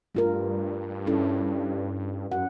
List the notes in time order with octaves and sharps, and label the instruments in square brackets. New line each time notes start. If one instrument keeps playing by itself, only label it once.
[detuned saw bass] G2 [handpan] A3 F4 A#4
[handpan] C#4 E4 A4
[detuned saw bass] F#2 [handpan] F#5